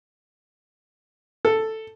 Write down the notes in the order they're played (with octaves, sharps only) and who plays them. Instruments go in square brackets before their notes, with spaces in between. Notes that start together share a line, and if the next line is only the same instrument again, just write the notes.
[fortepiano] A4